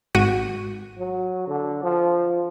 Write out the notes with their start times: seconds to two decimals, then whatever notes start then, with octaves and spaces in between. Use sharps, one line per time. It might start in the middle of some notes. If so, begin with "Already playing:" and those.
0.15 G#1 F#4 D#7
0.98 F#3
1.48 D3
1.83 F3